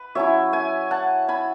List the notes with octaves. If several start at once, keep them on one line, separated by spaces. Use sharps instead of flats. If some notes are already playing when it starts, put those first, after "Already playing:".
Already playing: B4
F#3 C#4 E4 C#5 E5
E5 G#5
F#5 A5
G#5 B5